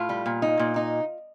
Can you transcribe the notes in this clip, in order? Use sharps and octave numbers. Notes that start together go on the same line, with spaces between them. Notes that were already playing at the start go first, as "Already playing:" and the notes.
Already playing: A2 F4
G3
A#2
D#4
A#2
D#4